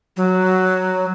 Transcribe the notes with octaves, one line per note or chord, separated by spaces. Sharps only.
F#3